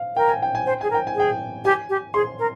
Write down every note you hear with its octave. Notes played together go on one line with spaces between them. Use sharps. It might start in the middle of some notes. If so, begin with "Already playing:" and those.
Already playing: F5
A#4 G5
G#5
G5
G#5
C5 G5
G#4 G#5
A#4
G5
G#5
G#4 G5
G4 G#5
G4
G#4 C6
A#4